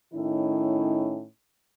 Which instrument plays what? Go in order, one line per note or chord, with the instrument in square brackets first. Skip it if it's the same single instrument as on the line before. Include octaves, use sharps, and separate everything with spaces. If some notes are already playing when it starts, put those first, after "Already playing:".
[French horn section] A2 D#3 C#4 D#4 E4